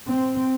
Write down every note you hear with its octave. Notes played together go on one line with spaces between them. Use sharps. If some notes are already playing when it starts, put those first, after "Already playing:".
C4